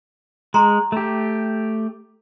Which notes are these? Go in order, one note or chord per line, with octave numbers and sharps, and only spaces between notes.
G#3 G#4 A#5 C6
A3 G4